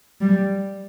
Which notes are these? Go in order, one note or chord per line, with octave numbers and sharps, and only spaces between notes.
G3